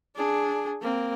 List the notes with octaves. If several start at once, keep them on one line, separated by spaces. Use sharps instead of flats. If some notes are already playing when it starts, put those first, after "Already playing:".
D4 G#4
A#3 C4